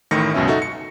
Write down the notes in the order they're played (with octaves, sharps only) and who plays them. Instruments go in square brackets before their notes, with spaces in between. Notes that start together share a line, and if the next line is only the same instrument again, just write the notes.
[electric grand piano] A1 A2 D#3 A#6 C#7
C#2 F#2 B2 C#4 E5
D#4 F#4 A4 E5
C#7